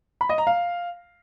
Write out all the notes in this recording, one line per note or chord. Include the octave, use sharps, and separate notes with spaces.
B5
D#5
A#5
F5